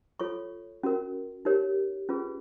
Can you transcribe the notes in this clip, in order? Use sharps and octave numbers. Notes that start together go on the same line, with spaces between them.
F4 A4 C#5 C#6
C#4 F#4 A#4
D#4 G4 A#4 C#5
C#4 F4 G#4 B4